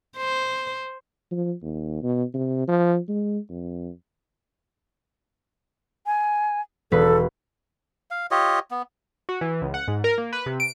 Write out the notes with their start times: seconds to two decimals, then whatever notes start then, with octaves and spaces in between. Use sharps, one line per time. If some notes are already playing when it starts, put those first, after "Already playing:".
0.17 C5
1.32 F3
1.63 D#2
2.03 B2
2.34 C3
2.68 F3
3.08 G#3
3.50 F2
6.06 G#5
6.92 E1 A4 B4
8.11 F5
8.31 F4 G4 C#5 D#5
8.71 B3
9.29 F#4
9.41 E3
9.62 C#2
9.74 F#5
9.88 G#2
10.04 A#4
10.18 A#3
10.33 B4
10.46 C3
10.60 D7